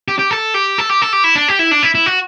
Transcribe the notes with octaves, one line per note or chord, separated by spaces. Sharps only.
G4
G4
A4
G4
A4
G4
A4
G4
E4
D4
G4
E4
D4
E4
E4
F#4